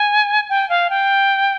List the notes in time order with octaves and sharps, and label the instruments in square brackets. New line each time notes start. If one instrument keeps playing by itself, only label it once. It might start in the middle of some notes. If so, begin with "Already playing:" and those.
Already playing: [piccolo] G#5
G5
F5
G5